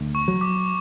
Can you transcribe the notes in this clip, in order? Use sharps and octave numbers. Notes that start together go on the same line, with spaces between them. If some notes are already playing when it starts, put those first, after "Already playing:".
Already playing: D2
C#6
F#3
D6